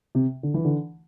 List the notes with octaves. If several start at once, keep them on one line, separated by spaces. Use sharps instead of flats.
C3
D3
E3
D3